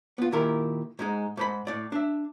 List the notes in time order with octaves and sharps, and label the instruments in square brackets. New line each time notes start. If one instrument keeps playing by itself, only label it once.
[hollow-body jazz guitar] B3 F4
A#2 D#3 E4 G4 A#4
G#2 G#3 D#4
G#2 B4 B5
A2 D5
D4 E5